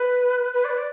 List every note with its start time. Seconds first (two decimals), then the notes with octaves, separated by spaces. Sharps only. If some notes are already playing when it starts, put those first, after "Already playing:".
Already playing: B4
0.53 B4
0.64 D5
0.69 B4
0.78 D5